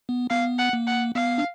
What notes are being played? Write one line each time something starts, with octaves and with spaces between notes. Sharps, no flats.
B3
B3 F5
F#5
A#3
F#5
B3 F5
D4